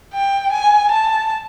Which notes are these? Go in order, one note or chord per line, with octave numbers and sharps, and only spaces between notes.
G5
G#5
A5